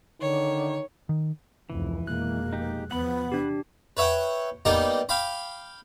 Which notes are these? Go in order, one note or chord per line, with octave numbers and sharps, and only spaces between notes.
D3 D#3 C#5
D#3
F1 C#2 E3
F1 B2 G#3 A#3 F#6
D#4 G4
E2 F3 B3 F#5 B5
C3 D4 G4
B4 C#5 E5 F#5 G5
G3 A#3 B3 D#4 D#5 G5
F5 G5 B5 D6